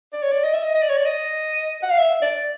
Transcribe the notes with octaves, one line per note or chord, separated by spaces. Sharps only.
D5
C#5
D5
D#5
E5
D#5
D#5
D5
C#5
D5
D#5
F#5
F5
E5
D5